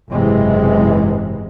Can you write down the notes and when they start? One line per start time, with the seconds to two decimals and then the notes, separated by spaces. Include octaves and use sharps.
0.10 F#1 G#2 C3 E3 G#3